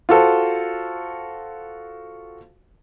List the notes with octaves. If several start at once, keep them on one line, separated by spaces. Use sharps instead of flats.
F4 F#4 A4 C5